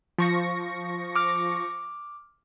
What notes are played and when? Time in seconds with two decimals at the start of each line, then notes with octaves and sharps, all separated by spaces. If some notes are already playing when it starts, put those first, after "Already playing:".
0.18 F3 C#6 A#6
1.16 D6 F6